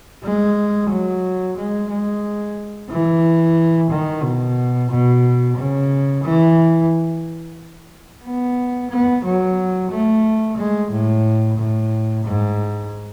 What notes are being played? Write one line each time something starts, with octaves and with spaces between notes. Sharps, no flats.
G#3
F#3
G#3
G#3
E3
D#3
B2
B2
C#3
E3
B3
B3
F#3
A3
G#3
A2
A2
G#2